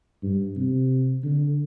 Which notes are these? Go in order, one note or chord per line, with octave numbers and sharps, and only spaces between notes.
G2
C3
D3